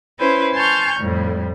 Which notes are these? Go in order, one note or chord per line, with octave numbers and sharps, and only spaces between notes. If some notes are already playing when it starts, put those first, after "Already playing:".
C#4 E4 B4 C5
G#5 A5 C6 C#6 F6 G6
F2 A2 G3